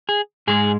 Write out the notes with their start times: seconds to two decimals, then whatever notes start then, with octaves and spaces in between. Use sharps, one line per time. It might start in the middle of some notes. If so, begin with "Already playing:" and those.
0.09 G#4
0.47 G#2 G#3 G#4